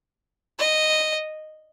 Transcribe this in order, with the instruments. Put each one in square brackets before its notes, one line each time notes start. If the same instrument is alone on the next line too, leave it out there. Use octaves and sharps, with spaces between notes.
[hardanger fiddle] D#5